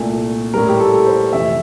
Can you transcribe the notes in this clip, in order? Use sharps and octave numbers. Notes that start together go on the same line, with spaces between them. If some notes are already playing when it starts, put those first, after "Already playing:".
Already playing: C2 A#2 A3
A2 G3 A#4
G4
A4
C5
F2 C3 E3 A3 E5